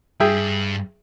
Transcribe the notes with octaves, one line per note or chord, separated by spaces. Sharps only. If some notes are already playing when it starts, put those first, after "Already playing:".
G2 G#4 E5 G5